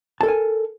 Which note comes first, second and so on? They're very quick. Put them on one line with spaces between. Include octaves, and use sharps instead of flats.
A5 A4 A#4 G#5